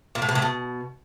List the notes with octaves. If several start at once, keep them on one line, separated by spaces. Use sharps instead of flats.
A#2
A2
B2
A2
B2